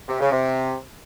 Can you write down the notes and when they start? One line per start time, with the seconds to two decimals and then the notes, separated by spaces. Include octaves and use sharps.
0.08 C3
0.20 C#3
0.32 C3